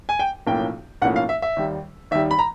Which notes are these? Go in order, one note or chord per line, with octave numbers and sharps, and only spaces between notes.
G#5
G5
B1 A2 F3 A#3 C#4 G5
B1 A2 F3 A#3 C#4 F#5
F5
E5
E5
D#2 D#3 G3
D#2 D#3 G3 E5
B5
A#5